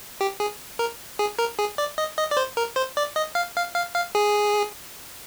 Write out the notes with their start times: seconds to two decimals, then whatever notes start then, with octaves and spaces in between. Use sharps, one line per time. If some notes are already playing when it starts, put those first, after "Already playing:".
0.21 G4
0.40 G#4
0.79 A#4
1.19 G#4
1.39 A#4
1.59 G#4
1.78 D5
1.98 D#5
2.18 D#5
2.31 D5
2.37 C5
2.57 A#4
2.76 C5
2.97 D5
3.16 D#5
3.35 F5
3.56 F5
3.75 F5
3.95 F5
4.15 G#4